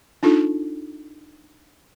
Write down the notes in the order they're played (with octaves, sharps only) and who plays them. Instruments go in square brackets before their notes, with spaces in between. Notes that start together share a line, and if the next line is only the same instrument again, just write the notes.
[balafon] D4 D#4 F4 A4